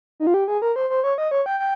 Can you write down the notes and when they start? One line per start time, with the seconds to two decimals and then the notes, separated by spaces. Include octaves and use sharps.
0.20 D#4
0.27 F4
0.34 G4
0.48 G#4
0.62 A#4
0.76 C5
0.90 C5
1.04 C#5
1.18 D#5
1.31 C#5
1.46 G5
1.60 G5